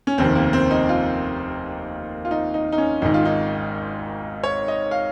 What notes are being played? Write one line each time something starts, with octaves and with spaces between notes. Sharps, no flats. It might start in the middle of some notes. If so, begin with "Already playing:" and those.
C#4
F1 D#2 D#3 C4
A#3
C4
D#4
F4
F4
D#4
D#4
D#4
C#4
G#1 G#2 D#3 D#4
F4
D#4
C#5
D#5
F5